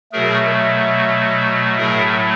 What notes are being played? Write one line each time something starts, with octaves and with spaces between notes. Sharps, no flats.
B2 F#3 A3 G#4 A#4
A2 F#3 A3 G#4 A#4